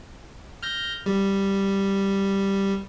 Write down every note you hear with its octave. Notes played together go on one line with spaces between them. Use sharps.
F6 G6 A#6
G3